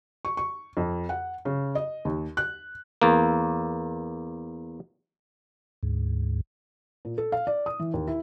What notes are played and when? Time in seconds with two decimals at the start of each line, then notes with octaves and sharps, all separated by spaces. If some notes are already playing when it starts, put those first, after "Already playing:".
0.25 C#6
0.37 C#6
0.77 F2
1.09 F#5
1.45 C#3
1.75 D#5
2.05 D#2
2.37 F#6
3.02 E2 A#3
5.83 D2 G#2
7.05 A#2
7.18 A4
7.32 F5
7.47 D5
7.66 D#6
7.80 E3
7.94 D#2
8.07 E4